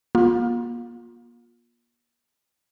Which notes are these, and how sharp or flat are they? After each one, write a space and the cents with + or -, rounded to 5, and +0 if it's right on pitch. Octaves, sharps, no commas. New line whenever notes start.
A#3 +40 F4 +20